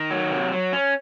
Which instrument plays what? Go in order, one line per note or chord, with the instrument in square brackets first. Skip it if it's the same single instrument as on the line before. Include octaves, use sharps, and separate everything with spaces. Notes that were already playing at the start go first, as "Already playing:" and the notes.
Already playing: [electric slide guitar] D#3
F#3
C3
F#3
C#4